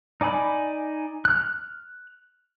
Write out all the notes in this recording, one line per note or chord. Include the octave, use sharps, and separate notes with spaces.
D#4 D5 G#5 B5
F6 F#6